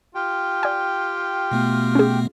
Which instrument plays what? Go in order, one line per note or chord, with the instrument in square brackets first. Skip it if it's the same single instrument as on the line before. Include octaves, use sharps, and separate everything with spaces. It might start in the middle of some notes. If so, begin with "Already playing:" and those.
[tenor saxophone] F4 [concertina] G4 G5
[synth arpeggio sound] D5 G#5
[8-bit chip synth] B2 A3 B3
[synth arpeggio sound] C#4 G#4